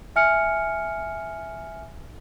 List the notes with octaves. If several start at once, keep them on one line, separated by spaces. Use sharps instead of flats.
E5 G#5 F6 C#7